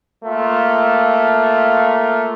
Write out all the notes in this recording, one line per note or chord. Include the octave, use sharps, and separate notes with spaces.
A3 A#3 F4